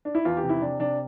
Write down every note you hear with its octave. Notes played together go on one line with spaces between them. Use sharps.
D4
E4
E2 F4
G4
C3
E4
C3 D4
C3 D4